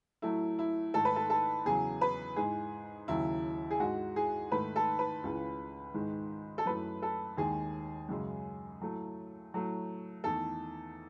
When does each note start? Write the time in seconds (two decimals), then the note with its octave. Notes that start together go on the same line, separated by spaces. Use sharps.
0.22 A2 F#3 A3 E4
0.59 E4
0.94 G#2 D#3 A3 A4
1.05 B4
1.16 A4
1.30 A4
1.65 E2 C#3 F#3 G#4
2.01 B4
2.36 G#2 E3 G#3 G#4
3.08 D#2 C#3 F#3 E4
3.71 G#4
3.79 G#2 E3 G#3 F#4
4.16 G#4
4.52 G#2 D#3 A3 B4
4.76 A4
4.99 B4
5.24 C#2 C#3 E3
5.94 G#2 D#3 G#3
6.58 A4
6.66 F#2 E3 A3 B4
7.02 A4
7.37 D#2 D#3 G#3 G#4
8.09 F#2 C#3 G#3
8.80 A2 F#3 A3
9.52 A2 F#3 A3
10.24 E2 D#3 A3 A4